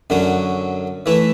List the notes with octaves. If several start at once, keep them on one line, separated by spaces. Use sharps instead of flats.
F#2 D3 F#3 C#4 F#4
E3 A3 E4 B4